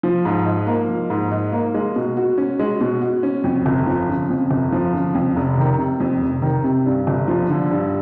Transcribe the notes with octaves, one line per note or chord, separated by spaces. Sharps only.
F3
G#2
D#4
A#3
F3
G#2
D#4
A#3
G#3
B2
F#4
C#4
G#3
B2
F#4
C#4
F2
G1
F3
C#3
F2
G1
F3
C#3
F2
F1
D#3
C3
F2
F1
D#3
C3
G2
G1
F3
D3
G2